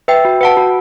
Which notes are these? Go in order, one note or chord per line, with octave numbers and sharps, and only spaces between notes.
B4 E5 G5
F#4
B4 F#5 A5
F#4